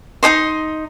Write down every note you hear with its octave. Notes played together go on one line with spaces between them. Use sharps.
D#4 A4 D#5 C6